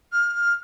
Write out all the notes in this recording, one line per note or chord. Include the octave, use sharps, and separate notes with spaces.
F6